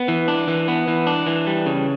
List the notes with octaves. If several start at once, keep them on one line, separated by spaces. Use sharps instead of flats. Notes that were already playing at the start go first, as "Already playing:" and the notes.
Already playing: B3
E3
D4
E3
B3
E3
D4
E3
G3
C#3